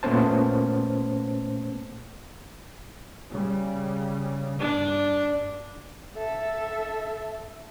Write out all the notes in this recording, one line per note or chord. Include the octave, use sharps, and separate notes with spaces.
A#2 A3 B3 C#4 C5 A5
C#3 G3
G2 D4
A4 E5